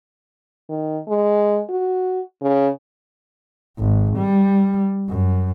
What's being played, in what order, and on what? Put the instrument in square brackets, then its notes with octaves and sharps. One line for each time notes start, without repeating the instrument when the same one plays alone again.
[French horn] D#3
G#3
F#4
C#3
[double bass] G#1
G3
F#2